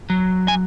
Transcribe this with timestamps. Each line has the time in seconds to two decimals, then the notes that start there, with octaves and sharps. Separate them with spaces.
0.10 F#3
0.48 G#5